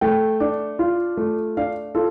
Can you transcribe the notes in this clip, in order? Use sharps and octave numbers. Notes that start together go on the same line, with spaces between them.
A3 G5
D4
F4
A3
D4 F5
F4 A4